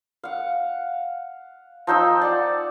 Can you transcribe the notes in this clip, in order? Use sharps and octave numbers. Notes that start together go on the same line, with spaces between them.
F5 F#5
F3 D#4 G5 E6
D5 F#5